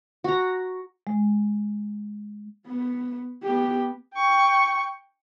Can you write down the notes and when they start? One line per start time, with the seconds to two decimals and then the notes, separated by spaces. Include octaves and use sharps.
0.24 F#4 A#5
1.07 G#3
2.67 B3
3.43 B3 G4
4.14 G5 C#6